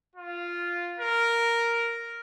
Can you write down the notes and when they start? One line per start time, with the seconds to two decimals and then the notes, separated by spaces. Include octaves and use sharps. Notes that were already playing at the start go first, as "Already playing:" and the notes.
0.16 F4
0.99 A#4